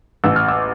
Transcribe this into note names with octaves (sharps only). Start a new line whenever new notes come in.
A1 E6
F6
D6 E6